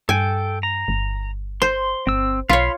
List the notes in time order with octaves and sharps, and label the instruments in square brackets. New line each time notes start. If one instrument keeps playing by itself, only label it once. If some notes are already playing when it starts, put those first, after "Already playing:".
[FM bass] G2 [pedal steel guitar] A4 G5 [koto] G#5
[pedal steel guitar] A#5
[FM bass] G1
[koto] C5 [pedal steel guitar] C6
[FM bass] G1 [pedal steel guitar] C4 E6
[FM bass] B1 [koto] F4 C#5 [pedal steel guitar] F5 B5 C6